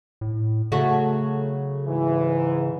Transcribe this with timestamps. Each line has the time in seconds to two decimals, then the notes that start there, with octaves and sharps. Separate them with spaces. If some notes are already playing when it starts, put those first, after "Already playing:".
0.21 A2
0.72 C#3 F#3 A3 F#4
1.87 G#2 E3